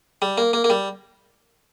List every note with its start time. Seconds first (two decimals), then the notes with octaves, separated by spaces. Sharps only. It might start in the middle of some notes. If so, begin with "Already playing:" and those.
0.22 G3
0.38 A#3
0.53 A#3
0.64 A#3
0.70 G3